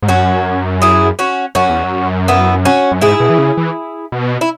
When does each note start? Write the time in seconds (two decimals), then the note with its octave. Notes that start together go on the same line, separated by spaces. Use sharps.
0.02 G#2
0.08 F#2 C#4 F#4
0.82 E4 G#4
1.19 C#4 F#4
1.55 F#2 C#4 F#4
1.69 E2
1.84 F#2
2.28 B3 E4
2.65 C#4 F#4
2.92 F#2
3.01 G#2 E4 G#4
3.20 B2
3.30 E3
3.38 C#3
3.57 E3
4.12 B2
4.41 E4